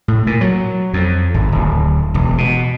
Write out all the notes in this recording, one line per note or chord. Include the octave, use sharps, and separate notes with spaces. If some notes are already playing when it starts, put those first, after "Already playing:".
A2
A#2
F#3
F2
G#1
D1
E1
B2